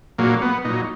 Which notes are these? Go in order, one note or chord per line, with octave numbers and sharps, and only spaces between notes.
A#2 F#3 A#3
B3
A#2 F#3 D#4